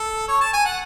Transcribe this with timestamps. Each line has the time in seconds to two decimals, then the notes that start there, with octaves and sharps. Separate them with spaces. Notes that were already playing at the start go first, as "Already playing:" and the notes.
Already playing: A4
0.28 C#5
0.41 A5
0.53 G#5
0.65 F#5